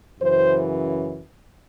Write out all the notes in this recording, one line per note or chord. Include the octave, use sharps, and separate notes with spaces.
F#2 C#3 E3 C5